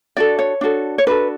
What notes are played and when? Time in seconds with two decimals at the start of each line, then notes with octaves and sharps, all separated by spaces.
0.17 D4 F#4 A4 D5
0.39 C#5
0.61 D4 F#4 A4
0.98 C#5
1.07 D4 F#4 A4 B4